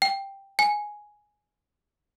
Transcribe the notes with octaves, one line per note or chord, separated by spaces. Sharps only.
G5
G#5